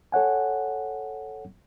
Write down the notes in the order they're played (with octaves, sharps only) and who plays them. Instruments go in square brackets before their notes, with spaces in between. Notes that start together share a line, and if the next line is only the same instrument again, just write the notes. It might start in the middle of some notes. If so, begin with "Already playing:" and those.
[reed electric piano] A4 C#5 F#5 G#5